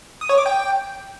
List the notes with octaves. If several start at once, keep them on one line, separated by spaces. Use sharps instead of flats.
D#6
C#5
D6
G5